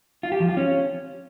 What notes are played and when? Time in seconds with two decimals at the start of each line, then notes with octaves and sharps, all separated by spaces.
0.23 F4
0.32 G4
0.40 F3
0.49 F4
0.57 C#4